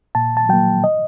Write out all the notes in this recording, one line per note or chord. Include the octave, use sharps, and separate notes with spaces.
A#2 A5
A5
F#3 A#3 G5
D#5